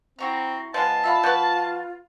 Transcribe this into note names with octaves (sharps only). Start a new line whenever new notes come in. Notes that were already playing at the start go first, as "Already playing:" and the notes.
C4 E4 F#4 A#5
F3 G#3 B3 F5 A5
F4 E5 F5 B5
F3 F#4 B4 F#6